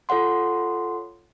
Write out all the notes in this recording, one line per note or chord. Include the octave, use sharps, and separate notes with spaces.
F4 A4 C#5 F#5 C6